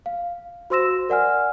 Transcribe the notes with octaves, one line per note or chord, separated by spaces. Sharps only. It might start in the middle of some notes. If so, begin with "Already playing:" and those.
F5
F#4 C5 C6 E6 A#6 E7
A#4 D5 F#5 G#5 F6